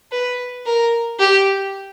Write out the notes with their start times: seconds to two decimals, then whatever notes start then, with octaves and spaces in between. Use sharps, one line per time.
0.12 B4
0.66 A#4
1.19 G4